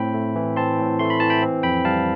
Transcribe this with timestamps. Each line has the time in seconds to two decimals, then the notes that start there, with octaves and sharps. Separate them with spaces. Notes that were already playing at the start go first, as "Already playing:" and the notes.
Already playing: A2 C4 G5 B5
0.14 A3
0.36 E3
0.56 C4 A5 C6
0.79 A2
0.99 A3 C6
1.10 B5
1.20 E3 A5
1.30 G5 B5
1.42 C4
1.63 F2 G5 B5
1.85 G3 F5 A5